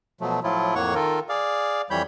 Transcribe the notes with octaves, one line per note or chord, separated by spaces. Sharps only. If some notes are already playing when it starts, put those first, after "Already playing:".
B2 F3 F#3 A3
A2 F3 F#3 E4 F4
F2 A2 A#3 C#5 F#5 C#6
D#3 F4 A4 A#4
G#4 D5 F5
F2 E3 G3 C#5 B5 G6